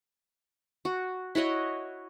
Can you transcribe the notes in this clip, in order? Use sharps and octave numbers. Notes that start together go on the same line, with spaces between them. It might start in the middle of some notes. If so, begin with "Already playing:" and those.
F#4
E4 F#4 C#5 D#5